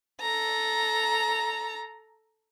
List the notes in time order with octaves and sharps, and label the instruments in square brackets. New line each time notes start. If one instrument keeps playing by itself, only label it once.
[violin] A4 A#5